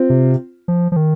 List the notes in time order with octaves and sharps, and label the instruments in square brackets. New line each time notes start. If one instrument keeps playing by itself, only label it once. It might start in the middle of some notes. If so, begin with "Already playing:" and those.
Already playing: [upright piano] C4 F4
[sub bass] C3
F3
F3
D#3